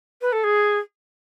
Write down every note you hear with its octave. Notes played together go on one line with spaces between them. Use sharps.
B4
A4
G#4